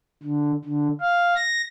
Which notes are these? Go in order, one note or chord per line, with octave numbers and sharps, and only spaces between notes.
D3
D3
F5
A#6